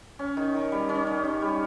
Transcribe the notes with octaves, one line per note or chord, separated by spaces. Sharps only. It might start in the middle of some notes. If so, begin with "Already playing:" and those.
C#4
D#3
D#3
G3
C#4
D#3
D#3
G3